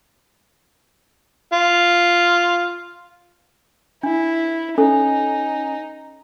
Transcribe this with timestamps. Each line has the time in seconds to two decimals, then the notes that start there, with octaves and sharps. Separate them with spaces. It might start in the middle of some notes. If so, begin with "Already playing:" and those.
1.53 F4
4.03 D4 E4
4.78 C#4 D#4 A4